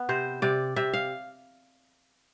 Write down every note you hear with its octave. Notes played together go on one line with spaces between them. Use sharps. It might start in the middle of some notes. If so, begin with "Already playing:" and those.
Already playing: B3
C3 C5
C3 D5
C3 E5
F5